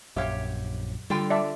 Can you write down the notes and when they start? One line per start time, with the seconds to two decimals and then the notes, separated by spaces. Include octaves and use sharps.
0.16 A#1 F#2 G4 C#5 E5 F5 G5
1.10 D3 G3 F4 G5
1.30 D5 E5 A5